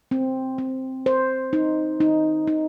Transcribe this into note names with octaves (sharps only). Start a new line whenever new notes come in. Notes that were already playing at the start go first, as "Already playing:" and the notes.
C4
C4
C5
D#4
D#4
D#4